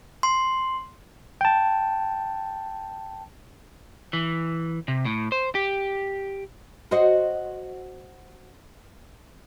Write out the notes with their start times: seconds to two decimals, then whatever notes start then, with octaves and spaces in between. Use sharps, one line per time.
0.23 C6
1.41 G5 A5
4.13 E3
4.88 C3
5.05 A2
5.32 C5
5.55 G4
6.91 F#4 C5 D#5